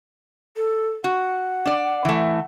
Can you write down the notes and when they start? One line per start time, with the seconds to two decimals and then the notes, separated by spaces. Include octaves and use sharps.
0.57 A4
1.04 F#4 F#5
1.66 D4 D5
2.05 E3 A3